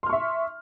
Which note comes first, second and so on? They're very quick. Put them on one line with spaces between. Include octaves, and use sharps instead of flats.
C6 F6 C#6 E5